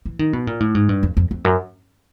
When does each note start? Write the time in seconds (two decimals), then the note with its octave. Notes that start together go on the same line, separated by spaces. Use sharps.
0.05 E3
0.19 D#3
0.33 B2
0.47 A#2
0.60 A2
0.75 G#2
0.89 G2
1.03 F2
1.17 F2
1.31 F2
1.45 F#2